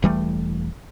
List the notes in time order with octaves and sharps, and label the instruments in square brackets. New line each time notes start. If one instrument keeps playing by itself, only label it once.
[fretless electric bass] E1 E3 G3 A3